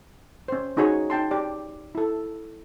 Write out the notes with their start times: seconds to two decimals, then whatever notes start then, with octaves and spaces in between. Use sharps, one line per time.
0.48 C#4 C5
0.76 C#4 D#4 F#4 G#4 C#5 D#5
1.10 D#4 G5 A5 C6
1.31 G4 D5
1.95 E4 A4